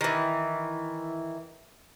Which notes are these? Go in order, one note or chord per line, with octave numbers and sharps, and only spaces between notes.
D#3 E3